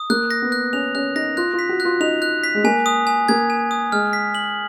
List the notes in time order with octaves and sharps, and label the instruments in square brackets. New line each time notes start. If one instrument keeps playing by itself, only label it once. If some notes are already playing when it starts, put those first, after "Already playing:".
Already playing: [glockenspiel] D#6
[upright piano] A#3 [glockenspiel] F#6
[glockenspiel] A#6
[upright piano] B3
[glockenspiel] F#6
[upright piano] C#4 [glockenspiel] F7
[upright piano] C#4 [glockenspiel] F#6
[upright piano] D#4 [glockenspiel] A#6
[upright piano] F4 [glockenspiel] F#6
[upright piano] F4
[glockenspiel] B6
[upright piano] F#4
[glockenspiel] F#6
[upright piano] F4
[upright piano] D#4 [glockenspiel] F7
[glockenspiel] F#6
B6
[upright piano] G#3
[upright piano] A#3 [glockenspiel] G#5
[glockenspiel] D#6
G#5
[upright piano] A#3 [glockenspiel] G#6
[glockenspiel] G#5
D#6
[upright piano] G#3 [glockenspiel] F6
[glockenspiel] B6
F#7